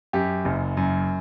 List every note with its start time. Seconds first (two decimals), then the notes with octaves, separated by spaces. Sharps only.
0.13 F#2 G4
0.45 F#1
0.77 F#2